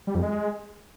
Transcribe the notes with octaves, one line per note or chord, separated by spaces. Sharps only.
G3
F2
G#3